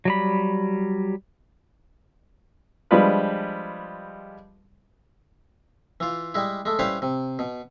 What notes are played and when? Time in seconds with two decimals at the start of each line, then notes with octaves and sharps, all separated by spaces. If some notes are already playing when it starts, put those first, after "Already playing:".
0.05 F#3 G3 B5
2.91 F3 G3 G#3 D4 F4 B4
6.00 E3 F4
6.34 G3 G#3 E4
6.65 G#3 A3
6.79 G3 C#4 E4 B4 C5 F5
7.02 C3
7.39 B2